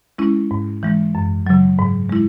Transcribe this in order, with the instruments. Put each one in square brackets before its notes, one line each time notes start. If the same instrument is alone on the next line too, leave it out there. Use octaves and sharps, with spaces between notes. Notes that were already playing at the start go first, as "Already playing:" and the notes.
[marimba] G#3 C#4 E4
G#2
E3 G#3
F#2
C#3 F#3
G#2
G#3 E4